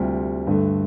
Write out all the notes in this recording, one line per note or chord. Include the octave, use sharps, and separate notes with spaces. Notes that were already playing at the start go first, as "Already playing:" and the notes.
Already playing: D2 C3 G3 F4
G2 D3 A3